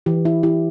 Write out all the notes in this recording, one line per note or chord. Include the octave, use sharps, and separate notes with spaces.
E3 G4
E4
E4 G4